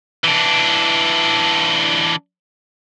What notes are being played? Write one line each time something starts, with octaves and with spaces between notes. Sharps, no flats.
E3 D4